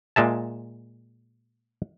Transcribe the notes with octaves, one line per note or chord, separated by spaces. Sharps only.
A#2 G#3 E5 A5